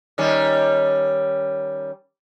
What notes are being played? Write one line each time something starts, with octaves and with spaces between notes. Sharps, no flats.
D#3 G3 C#4